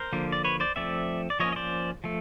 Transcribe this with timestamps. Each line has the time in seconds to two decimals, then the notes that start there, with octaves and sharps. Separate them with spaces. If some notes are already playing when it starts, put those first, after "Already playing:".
Already playing: A#4 C5
0.13 D3 F3 A#3
0.32 D5
0.44 B4 C#5
0.60 C5 D5
0.76 F3 A3 C4 D5 E5
1.30 D5
1.40 F3 A#3 C#4 C#5 D#5
1.52 D#5
1.56 C5 D5
2.04 F3 A3